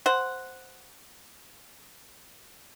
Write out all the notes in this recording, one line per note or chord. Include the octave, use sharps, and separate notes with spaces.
C5 F#5